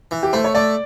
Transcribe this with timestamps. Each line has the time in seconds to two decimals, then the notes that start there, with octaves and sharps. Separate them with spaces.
0.11 E3
0.23 G4
0.33 A3 C5
0.44 C#5
0.54 A3 D5